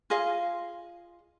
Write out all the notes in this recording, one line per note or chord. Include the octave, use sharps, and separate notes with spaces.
F4 G#4 D#5 F5